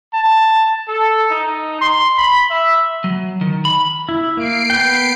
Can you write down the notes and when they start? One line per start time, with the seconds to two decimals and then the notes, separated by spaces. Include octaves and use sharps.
0.14 A5
0.88 A4
1.31 D#4
1.81 C6
2.17 B5
2.50 E5
3.04 F#3
3.41 D#3
3.65 B5
4.09 E4
4.37 A#3 C7 D7
4.70 B3 G5